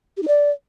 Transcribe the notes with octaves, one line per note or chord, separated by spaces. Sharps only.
G4
D#4
D5